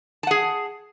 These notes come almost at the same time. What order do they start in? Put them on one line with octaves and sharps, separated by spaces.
A5 F#5 G#4